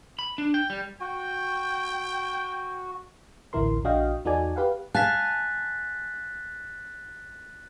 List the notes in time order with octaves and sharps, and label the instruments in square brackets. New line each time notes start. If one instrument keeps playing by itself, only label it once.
[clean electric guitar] B5
D4
G5
G3
[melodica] F#4 [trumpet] G5
[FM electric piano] A1 D2 E4 A#4 C6
A#1 D4 F#4 D#5 F5 G5
E2 D#4 F#4 A4 D5 G#5
G4 B4 F5 F#5
[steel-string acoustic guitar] F5 G#5 A5 [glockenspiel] F#6 A6 B6